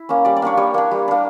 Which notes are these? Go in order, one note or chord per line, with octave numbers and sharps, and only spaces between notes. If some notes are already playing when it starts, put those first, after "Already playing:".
Already playing: E4
A#3 C#4
G3 D5
D5
A#3 D4 C#5
G3 C#5
A#3 D4
G3
A#3 D4